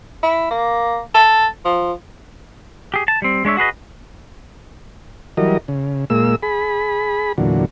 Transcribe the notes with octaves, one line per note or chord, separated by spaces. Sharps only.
E4
A#3
A4
F3
G4 G#4
A5
G3 C4
G#3 D4 C#5 E5
F#4 G#4 B4 D#5
E3 F#3 G3 A#4 D#5
C#3
A#2 G#3 A#3 E6
G#4 B5
E2 A#2 D3 F#3